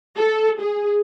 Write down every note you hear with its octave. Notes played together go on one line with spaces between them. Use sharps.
A4
G#4